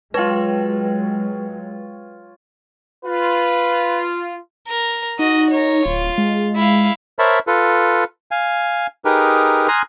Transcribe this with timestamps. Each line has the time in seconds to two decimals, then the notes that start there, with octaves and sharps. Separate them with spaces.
0.14 F#3 G#3 F4 B4 C#5 G5
3.05 F4 B4
4.68 A#4
5.19 D#4 F#4 D#5
5.51 A#4 C#5
5.86 D1 F4
6.18 G#3
6.56 E4 F5
7.19 A#4 C5 C#5 E5 A5 B5
7.47 F4 A4 B4
8.31 F5 G#5
9.05 D#4 G4 G#4 A#4 B4
9.68 G#5 A#5 C6 D#6 F6 F#6